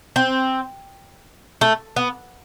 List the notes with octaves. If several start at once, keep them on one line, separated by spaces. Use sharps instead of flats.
C4
A3
B3